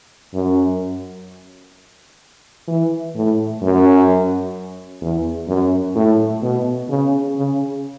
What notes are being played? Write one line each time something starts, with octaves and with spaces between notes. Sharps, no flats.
F#2
E3
A2
F#2
E2
F#2
A2
B2
C#3
C#3